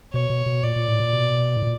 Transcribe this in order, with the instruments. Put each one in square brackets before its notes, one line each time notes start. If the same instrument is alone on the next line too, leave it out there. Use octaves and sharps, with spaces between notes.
[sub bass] B2 [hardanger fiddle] C#5
[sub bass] B2
B2
[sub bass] A#2 [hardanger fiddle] D5
[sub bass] A#2
A2
A#2
B2
A2
A#2